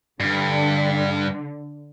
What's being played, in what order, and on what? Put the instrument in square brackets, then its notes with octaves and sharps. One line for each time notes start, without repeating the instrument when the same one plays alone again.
[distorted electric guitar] G2 [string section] D3